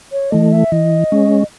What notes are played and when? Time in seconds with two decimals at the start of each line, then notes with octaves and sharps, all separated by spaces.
0.12 C#5
0.31 E3 A3 D#5
0.52 E5
0.72 E3 D#5
1.12 G#3 C#4